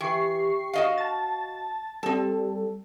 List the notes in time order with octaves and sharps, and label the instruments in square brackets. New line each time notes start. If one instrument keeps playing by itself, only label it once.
[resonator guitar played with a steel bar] E3 [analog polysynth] G4 C#6 C7
[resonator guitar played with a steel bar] F#4 D#5 F5
[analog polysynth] A5 A6
[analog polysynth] G3 A4 [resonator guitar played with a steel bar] C4 A5